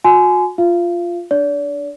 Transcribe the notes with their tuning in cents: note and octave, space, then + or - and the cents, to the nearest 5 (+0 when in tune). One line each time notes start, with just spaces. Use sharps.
F#4 -40 G#5 +25 C6 -30
F4 +0 F5 -30
D4 +0 D5 -40